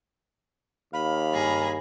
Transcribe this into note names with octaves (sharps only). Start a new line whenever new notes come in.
D#2 F5 B5
G2 G#4 A#5